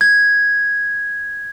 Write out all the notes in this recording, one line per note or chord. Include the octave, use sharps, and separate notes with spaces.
G#6